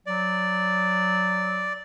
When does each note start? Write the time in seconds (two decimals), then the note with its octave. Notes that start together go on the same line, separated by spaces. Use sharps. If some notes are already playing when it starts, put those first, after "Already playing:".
0.06 F#3 D5